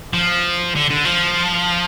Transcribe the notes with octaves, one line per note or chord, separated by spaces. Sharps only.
F3
D3
D3
F3